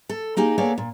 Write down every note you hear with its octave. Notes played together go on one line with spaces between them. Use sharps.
A4
A#3 D#4 G4 G#4
A#3 B3 G#4 A4 C#5 D5
A#2